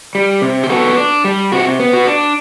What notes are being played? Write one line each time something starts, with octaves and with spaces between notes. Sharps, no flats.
G3
C3
G4
B3 F#4 A4
D4
G3
C3 F#4
B3
F#4
D4